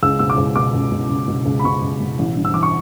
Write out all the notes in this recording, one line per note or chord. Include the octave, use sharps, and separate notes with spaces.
C#2 E6
B2 E6
D6
C#2
B2 D6
C#2
B2
C#2
B2
C#2
B5
B2 C#6
C#2
B2
A1
G2
E6
E3 D6
C#6